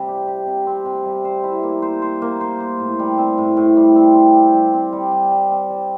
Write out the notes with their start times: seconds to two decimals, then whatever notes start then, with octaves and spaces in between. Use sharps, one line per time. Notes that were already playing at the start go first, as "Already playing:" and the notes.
Already playing: C3 G3
0.08 G4
0.28 G4
0.47 C3
0.67 C4
0.85 C3
1.05 G3
1.25 C5
1.44 E4
1.63 A#3
1.82 C5
2.02 C5
2.22 A#3
2.41 C5
2.60 C5
2.80 A2
2.99 G3
3.18 C4
3.38 A2
3.57 A2
3.77 G3
3.96 C4
4.15 C4
4.34 G4
4.54 G3
4.74 C4
4.93 G3
5.12 G3
5.31 G3
5.51 C4
5.70 G3